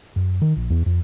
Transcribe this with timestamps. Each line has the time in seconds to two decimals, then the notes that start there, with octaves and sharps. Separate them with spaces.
0.16 F#2
0.42 D#3
0.56 A#1
0.70 E2
0.86 F2